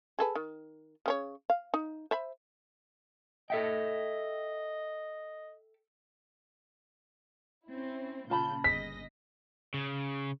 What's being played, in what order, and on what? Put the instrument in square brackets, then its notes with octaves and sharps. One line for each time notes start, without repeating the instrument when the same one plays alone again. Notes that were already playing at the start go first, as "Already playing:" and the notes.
[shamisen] G#4 A4 B4
D#3
C#3 C4 C#5
F5
D#4
C5 E5 B5
[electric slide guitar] A4 E5 G5 [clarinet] D#5
[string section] C4 C#4 E4
[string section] A#2 C#3 G6 [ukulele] F4 A5 B5
[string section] G1 D#5 A#6 [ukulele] G#4 [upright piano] B6
[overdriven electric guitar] C#3